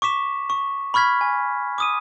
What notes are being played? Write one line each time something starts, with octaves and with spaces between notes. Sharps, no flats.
C#6 D6 B6 E7
C#6
B5 C#6 F6 G#6 B6
G#5
D6 D#6 D#7